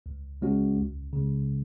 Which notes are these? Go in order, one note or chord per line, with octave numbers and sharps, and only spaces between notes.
C#2
C#3 G#3 C#4 F#4
C#2
C#3 G#3